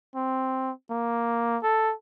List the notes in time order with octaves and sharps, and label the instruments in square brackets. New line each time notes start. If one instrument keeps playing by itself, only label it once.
[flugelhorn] C4
A#3
A4